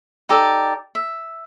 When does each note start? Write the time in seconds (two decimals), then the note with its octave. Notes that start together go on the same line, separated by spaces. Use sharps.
0.29 D#4 G4 A4 D5
0.95 E5